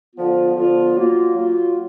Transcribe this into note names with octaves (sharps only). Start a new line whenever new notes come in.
D3 F3 B3 F4
D3 F3 B3 F4
F#3 A#3 F4
F#3 A#3 F4